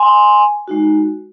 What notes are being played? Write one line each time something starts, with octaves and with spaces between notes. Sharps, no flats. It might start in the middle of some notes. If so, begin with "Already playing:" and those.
Already playing: G#5 C6
G#3 D#4 F#4